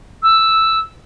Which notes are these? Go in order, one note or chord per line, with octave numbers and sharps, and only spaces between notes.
E6